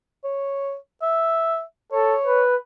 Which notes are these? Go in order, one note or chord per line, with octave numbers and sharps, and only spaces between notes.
C#5
E5
A4 C#5
B4